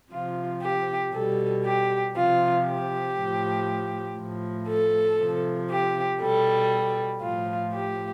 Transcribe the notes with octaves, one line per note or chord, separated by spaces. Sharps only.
C3 F3 F4
G4
B2 G3 A4
G4
C3 F3 F4
G4
A2 F3
A2 F3
A4
C3 F3
G4
B2 G3 A4
A2 F3 F4
G4